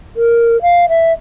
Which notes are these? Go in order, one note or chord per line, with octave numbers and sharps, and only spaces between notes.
A#4
F5
E5